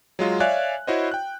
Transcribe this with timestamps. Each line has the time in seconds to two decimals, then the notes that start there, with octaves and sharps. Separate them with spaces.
0.19 F#3 G#3 F4
0.40 C#5 D5 E5 F5 G#5 F#6
0.87 E4 F#4 C5 C#5 D#5
1.11 G5 F#6